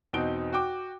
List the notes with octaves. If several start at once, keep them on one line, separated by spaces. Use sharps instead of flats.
E2 B2 C4 D#4 D7 G7
F#4 G5 D6